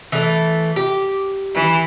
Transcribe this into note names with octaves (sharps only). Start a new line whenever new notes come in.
E3 A3
G4
E3